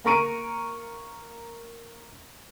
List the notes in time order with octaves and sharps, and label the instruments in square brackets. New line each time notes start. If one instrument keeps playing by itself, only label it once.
[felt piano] A#3 A#4 A#5 C#6 D7 D#7